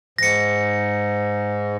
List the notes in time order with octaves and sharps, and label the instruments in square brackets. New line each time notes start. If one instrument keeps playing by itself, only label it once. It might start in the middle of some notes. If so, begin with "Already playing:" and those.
[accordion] G#2 [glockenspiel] A#6 C#7